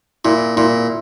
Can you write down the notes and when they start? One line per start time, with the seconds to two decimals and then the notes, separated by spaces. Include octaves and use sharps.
0.25 A#2 E4
0.57 A#2 E4